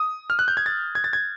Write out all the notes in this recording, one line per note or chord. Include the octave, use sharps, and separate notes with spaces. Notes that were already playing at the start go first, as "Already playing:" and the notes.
Already playing: D#6
F6
F#6
G6
G#6
A6
G#6
A6
G#6